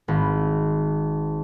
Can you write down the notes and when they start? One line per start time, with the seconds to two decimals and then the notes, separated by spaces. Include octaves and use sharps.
0.08 G#1